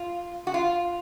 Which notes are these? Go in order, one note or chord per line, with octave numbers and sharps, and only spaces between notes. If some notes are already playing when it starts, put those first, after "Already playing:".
Already playing: F4
F#4
F4